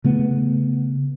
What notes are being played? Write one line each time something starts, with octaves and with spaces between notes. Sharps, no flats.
C#3 A3 B3